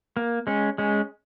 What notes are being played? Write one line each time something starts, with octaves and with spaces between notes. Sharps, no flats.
A#3
G#3 C#4
G#3 C#4